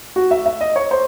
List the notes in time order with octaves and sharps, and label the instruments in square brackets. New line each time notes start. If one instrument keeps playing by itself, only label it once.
[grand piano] F#4
E5
E5
D#5
C#5
C5